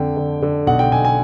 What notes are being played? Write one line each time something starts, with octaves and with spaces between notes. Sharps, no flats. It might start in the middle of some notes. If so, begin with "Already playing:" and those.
Already playing: F2 D3 G5
D3
D3
B1 F#5
G5
B1 G#5
G#5